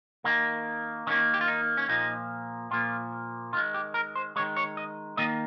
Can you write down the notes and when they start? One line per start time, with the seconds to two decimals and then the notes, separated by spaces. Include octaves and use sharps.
0.24 D#3 A#3
1.07 D#3 A#3 C#4
1.34 G4
1.41 F4
1.48 D#4
1.77 C#4
1.88 A#2 F3 A#3 D#4
2.71 A#2 F3 A#3 F4
3.53 D#3 G#3 F4
3.74 G4
3.94 A#4
4.15 C5
4.36 G#3 C#5
4.39 D#3
4.57 C#5
4.77 D#5
5.17 D#3 A#3 D#5